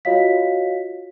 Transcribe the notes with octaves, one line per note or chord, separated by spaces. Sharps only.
F4 F#4 C#5 D#5 F5 B6